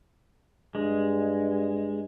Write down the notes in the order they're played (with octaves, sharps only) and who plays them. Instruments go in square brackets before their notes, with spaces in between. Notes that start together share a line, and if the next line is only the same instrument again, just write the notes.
[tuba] G2 [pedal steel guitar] G#3